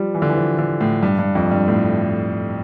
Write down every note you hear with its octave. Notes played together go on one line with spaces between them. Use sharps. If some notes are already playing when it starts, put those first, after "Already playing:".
Already playing: F3 G3
E3
D3
E3
F3
D3
A2
G2
G2
F2
G2
A2